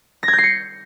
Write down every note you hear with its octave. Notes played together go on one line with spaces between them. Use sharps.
A#6
G#6
G6
C7
C#7